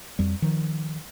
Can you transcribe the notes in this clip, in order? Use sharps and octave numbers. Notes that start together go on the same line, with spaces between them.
F2 G3
D#3 F3